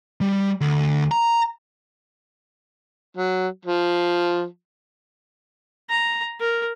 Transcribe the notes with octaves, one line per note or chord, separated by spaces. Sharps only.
G3
D2
A#5
F#3
F3
A#5
A#4